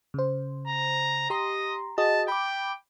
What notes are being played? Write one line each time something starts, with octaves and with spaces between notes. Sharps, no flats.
C#3 C5
A#5
G4 D#5 A#5 C6
F#4 G#4 D#5 A5
G5 B5 D6